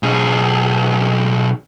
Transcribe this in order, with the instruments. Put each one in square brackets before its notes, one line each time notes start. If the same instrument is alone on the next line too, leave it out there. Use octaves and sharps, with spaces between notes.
[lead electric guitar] B1 G#4